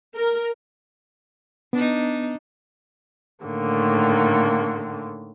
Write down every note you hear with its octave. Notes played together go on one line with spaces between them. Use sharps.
A#4
B3 D4 D#4
A2 D3 D#3 A#3